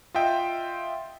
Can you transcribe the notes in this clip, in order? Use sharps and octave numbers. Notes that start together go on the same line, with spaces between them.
F4 D#5 E5 G5